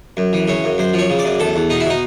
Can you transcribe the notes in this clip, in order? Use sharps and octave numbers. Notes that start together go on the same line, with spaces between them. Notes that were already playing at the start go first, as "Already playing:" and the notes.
F#2
E3
C#3 C#5
F#2
F#2 C5
F3 C#5
C#3
D5
F#2
E2 A4
E2
B2 D#4
E4
B2 D#4